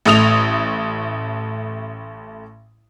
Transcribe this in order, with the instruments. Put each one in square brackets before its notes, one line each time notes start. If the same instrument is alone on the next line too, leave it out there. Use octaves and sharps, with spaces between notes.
[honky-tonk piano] A1 A3 D#6 F7